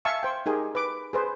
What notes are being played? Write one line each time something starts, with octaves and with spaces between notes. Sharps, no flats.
E5 F5 G#5 A5 C#6 E6
C5 G5
D#4 G4 G#4 A#4
B4 D6
G#4 B4 C5